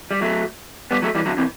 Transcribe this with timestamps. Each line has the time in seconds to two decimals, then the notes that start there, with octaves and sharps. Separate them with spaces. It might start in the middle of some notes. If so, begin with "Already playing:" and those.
0.11 G3
0.21 F#3 A3
0.91 G3 B3
1.02 F#3 A3
1.15 E3 G3
1.26 D3 F#3
1.38 C3 E3